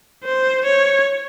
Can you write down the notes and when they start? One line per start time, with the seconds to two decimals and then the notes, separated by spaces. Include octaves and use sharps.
0.24 C5
0.65 C#5